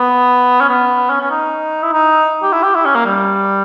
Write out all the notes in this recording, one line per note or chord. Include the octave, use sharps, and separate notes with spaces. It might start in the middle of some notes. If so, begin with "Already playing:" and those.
Already playing: B3
C#4
B3
C#4
C#4
D#4
E4
D#4
G4
E4
G4
E4
C#4
A#3
G3